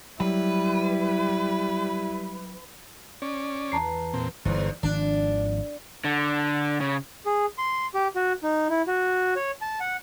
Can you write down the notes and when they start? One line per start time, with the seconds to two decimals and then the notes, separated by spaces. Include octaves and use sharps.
0.20 F#3 G3 E4 B4
3.22 C#4 D5
3.72 E2 A5 A#5 C7
4.14 A#2 C4
4.45 G1 E2 G#2
4.83 G#1 D#3 F3 D4
6.04 D3
6.81 C#3
7.26 G#4
7.58 C6
7.94 G4
8.16 F#4
8.43 D#4
8.70 E4
8.87 F#4
9.36 C#5
9.61 A5
9.80 F#5